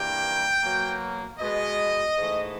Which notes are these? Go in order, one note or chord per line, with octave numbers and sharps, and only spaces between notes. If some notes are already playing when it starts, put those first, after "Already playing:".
Already playing: G2 E3 G3 A#3 G5
B2 F#3 A#3
B2 G#3 B3 D#5
G#2 E3 A3